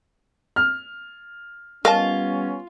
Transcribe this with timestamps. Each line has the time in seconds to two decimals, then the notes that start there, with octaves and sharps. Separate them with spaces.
0.56 F6
1.85 G3 B3 C#4 F4 A#4 D#5 A5